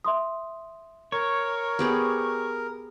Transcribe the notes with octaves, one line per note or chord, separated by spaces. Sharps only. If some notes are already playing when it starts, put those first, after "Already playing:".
E5 C6 D#6
A#4 C#5
B3 G4 G#4 B4